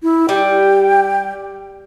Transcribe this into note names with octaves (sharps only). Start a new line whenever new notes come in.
E4
G3 G5